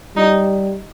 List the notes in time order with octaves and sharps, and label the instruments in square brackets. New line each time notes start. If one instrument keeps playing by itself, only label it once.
[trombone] G3 [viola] D#4